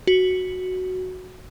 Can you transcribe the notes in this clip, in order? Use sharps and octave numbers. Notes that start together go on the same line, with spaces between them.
F#4